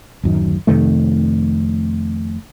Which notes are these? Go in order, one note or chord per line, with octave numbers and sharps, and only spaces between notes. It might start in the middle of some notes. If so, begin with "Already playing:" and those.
D1 F#2 D#3
F2 C3 D#3 A3